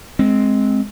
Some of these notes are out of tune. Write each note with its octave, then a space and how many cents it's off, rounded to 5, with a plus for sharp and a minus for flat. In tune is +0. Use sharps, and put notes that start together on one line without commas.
G#3 +15 C4 +0